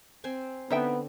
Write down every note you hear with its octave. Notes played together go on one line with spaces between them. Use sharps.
C4 C5 G#5
D3 B3 C4 D#4 E5 G5